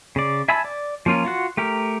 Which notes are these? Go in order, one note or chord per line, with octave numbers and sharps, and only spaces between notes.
C#3 D5
E5 G#5 A5 B5 E6
D5
F3 A#3 C#4 F4 A#4
F4 F#4 F#5
A3 G4 A#4